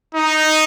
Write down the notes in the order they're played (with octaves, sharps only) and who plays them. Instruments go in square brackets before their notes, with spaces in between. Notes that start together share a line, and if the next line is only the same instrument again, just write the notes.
[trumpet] D#4